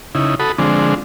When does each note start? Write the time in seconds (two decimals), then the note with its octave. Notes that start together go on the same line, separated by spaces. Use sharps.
0.15 C#3 D#4 E4
0.40 F#4 A4 B5 D#6
0.58 D3 F3 G#3 C4 D4